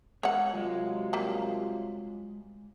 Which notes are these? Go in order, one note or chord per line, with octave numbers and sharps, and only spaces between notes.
G#3 A#4 C#5 F#5
C3 F#3 G#3 F4 D#5
G3 A#3